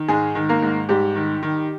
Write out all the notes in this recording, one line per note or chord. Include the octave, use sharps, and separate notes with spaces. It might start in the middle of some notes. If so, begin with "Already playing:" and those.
Already playing: D#3
G#2 G#3 G#4
D#3
A#3 A#4
G#2
G#2 G3 G4
D#3
D#3